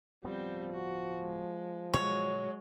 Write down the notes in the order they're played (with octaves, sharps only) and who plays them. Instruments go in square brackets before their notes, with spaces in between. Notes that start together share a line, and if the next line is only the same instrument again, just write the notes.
[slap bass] D1 G2 B3 [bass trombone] F3 [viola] G3 C4
[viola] F#4
G#3
[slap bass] A#2 D3 E3 [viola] F#3 G#3 [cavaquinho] C#5